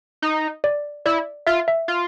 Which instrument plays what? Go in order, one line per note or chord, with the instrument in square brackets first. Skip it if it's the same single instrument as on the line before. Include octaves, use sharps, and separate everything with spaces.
[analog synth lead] D#4
[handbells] D5
[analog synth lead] E4 [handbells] D5
[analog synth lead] F4 [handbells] E5
[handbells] E5
[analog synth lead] F4